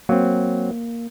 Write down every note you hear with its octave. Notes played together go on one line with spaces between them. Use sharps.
F#3 A#3 C4